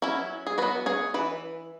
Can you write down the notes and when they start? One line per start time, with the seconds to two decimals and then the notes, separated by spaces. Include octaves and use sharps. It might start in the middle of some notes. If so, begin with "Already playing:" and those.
0.02 F#3 C#4 E4
0.47 G#4
0.58 F#3 B3 F#4 B4
0.86 G#4 C#5
1.14 E3 B4